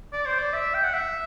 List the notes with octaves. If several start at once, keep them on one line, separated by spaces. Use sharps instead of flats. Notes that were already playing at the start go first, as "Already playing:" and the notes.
D5
C5
D5
E5
G5
F#5
E5